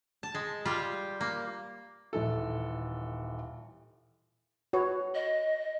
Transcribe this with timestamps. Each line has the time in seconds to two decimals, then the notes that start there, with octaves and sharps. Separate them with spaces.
0.23 A5
0.35 G#3
0.65 G3 F4 G4
1.21 A#3
2.13 D#1 E3 A4
4.73 F#4 B4 C#5
5.14 D#5